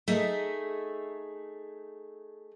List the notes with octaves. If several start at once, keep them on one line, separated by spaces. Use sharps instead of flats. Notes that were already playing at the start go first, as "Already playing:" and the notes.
A3 D#4 G#4 E5